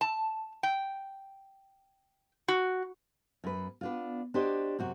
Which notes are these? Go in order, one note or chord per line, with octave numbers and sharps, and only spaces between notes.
A5
G5
F#4
F#2 B4
B3 D4 F4
D4 F#4 G4 C5 C#5 D#5
F#2 C3 F#4